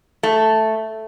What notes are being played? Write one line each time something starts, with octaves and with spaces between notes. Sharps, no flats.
A3